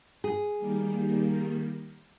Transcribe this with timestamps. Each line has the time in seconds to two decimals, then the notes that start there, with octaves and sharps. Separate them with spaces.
0.24 G#4
0.58 D#3 G3 A#3